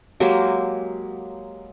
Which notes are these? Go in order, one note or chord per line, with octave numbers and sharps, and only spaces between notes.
F#3 G#3 A#3 G4